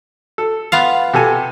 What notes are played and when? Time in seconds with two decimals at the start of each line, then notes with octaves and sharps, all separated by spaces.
0.38 A4
0.72 B3 F4 F5
1.14 C3 A4 G#5